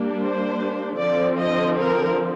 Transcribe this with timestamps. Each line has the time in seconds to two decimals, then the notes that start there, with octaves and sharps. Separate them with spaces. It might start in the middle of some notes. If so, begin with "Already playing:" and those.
Already playing: G3 A#3 D4
0.19 C5
0.99 D3 F3 C4 D5
1.39 D#5
1.79 A#4